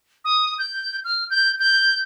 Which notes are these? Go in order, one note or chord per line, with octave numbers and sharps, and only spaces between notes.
D#6
G6
F6
G6
G6